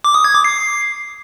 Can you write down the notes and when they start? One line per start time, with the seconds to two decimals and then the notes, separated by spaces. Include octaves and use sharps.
0.04 D6
0.14 D#6
0.24 G#6
0.34 D6
0.44 C7